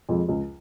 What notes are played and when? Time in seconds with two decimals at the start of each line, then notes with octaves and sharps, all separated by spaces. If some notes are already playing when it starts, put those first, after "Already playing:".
0.09 F2 F3 G#3
0.29 C#2